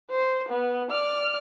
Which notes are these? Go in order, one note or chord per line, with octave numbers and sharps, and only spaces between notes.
C5
B3
D5 F6